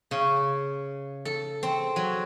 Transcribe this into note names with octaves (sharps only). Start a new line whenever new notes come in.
C#3
A4
C4
F#3